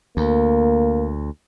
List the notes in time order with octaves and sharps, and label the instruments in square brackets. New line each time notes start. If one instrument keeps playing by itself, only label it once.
[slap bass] D2 [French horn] A#3